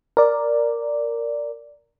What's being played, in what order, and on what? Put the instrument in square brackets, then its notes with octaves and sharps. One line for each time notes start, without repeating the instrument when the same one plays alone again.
[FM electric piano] A#4 D5